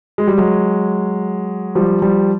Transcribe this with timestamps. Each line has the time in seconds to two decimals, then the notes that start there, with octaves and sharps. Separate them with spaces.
0.18 G#3
0.27 G3
0.38 F#3 G#3
1.75 F3 G3
2.02 F3 G3